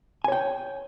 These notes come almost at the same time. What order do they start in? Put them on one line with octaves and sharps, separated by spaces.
G#5 C#5 G5